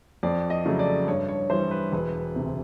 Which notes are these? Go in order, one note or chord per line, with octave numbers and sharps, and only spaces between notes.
F2 D5
D#5
C#3 F#3 A3
D5
G2 C#5
C#5
E3 G3 C5
B4
E1 B4
D2 C3